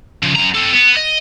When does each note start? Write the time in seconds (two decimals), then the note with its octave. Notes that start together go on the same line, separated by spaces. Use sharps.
0.23 C#3 F3
0.35 F#2 A#5
0.54 C4 A4
0.72 B3
0.97 D#5